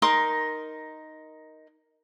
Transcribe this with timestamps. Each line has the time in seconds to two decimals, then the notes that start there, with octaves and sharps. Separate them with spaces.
0.02 D#4 A#4 C6 D#6